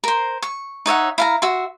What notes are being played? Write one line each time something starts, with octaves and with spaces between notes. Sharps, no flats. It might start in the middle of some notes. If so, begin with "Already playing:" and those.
A#4 C5
C#6
D#4 C#5 E5 F#5
E4 F5 A#5
F#4 E5 C6